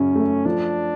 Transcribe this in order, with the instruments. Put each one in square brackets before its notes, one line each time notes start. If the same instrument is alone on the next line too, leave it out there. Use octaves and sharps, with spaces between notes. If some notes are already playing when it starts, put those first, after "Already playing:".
Already playing: [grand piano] F#2 C#3 [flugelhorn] C#4
[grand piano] A3
[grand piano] F3 [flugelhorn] D4